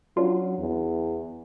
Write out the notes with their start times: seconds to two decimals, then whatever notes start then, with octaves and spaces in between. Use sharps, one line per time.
0.17 F#3 C#4 D4 F4
0.58 E2